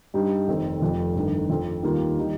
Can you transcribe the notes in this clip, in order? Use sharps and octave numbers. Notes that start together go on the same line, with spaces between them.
G2 G3 D#4 G4
F1 F2 D#3 C4
F1 F2 F3
G1 G2 D#3
F2 F3 C4
D#2 D#3 G3 A#3 F4
D#3 G3 D#4